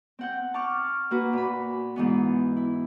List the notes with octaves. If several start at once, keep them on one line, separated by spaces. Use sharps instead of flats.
C4 F#5 G6
A5 C#6 D6 F6
A#3 F#4 B4
A#2 B5
G#2 E3 B3
E4